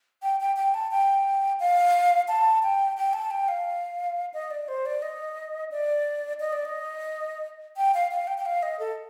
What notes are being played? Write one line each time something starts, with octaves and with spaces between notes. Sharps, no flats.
G5
G5
G5
A5
G5
F5
A5
G5
G5
A5
G5
F5
D#5
D5
C5
D5
D#5
D5
D#5
D5
D#5
G5
F5
F5
G5
G5
F5
D#5
A4